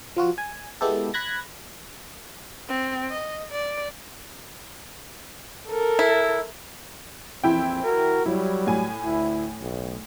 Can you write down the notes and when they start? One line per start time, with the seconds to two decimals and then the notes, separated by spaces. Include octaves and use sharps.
0.17 F3 F4 F#4
0.38 G#5
0.81 G#3 B3 E4 G4 A4
1.14 B5 F#6 G#6 A#6
2.69 C4
3.11 D#5
3.51 D5
5.68 A4 A#4
5.99 E4
7.44 A#1 F2 E3 C4 E4 G5
7.84 F#4 A#4
8.26 F#3 G3 E4
8.67 A2 G#5
9.03 D2 E4
9.60 B1